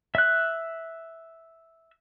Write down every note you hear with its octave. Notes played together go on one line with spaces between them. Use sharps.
E5 F#6